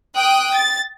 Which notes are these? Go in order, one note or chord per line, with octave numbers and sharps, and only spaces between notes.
G5 D#6 F#6
A6